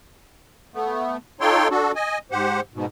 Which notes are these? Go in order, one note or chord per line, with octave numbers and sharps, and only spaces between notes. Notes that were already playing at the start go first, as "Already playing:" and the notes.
A3 B3
D#4 F4 A4 C#5 G5 C6
D4 F#4 A4
D#5 G#5
G#2 G4 C5 F#5
G#2 B2